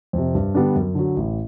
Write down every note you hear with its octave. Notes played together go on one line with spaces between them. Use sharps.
F2 C3
G2
D3 G3 B3 D4
F#2
D3 F#3
A1